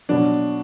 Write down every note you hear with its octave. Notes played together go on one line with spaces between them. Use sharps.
B2 F#3 D4